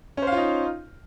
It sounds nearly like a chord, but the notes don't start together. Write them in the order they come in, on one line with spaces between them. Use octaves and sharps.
C#4 C5 F5 F4 D#4